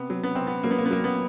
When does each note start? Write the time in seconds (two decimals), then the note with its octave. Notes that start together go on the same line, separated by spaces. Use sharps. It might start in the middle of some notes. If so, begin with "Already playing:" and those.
Already playing: C3 B3
0.10 F#3
0.23 B3
0.35 C3 C4
0.47 B3
0.63 F#3 A#3
0.71 B3
0.78 A#3
0.85 B3
0.90 F#3 A#3
1.04 B3